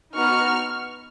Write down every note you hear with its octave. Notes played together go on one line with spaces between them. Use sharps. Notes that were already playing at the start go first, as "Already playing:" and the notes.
B3 D#4 F#4 C#6 F6